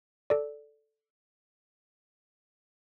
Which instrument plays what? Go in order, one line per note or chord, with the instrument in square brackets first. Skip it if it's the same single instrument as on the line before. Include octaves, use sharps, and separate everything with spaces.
[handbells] A4 D5